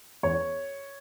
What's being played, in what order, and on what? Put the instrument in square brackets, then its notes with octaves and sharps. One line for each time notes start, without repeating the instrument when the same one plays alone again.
[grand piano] E2 C#5